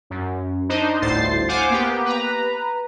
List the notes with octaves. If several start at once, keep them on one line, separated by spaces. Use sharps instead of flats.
F#2
D4 D#4 C5 D#5
G1 D2 A2 C5 A6 C7
C5 F5 F#5 G#5 D6
A#3 B3 G4
B4 A#5